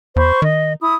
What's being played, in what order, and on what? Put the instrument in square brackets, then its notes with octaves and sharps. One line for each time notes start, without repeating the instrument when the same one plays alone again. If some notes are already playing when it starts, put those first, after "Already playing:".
[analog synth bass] E2 [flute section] C5 B5 C#6
[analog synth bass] D#3 [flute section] D#5
[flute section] E4 D#6